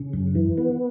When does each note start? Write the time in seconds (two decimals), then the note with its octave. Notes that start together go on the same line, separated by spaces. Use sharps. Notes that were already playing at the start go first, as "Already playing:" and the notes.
Already playing: C#3
0.13 F#2
0.35 E3
0.58 B3